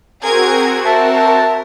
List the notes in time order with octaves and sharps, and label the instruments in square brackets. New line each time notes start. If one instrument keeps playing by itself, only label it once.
[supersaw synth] C4 F#4 [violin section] G#4 A#4 G#6
[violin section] A#4 [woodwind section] E5 A5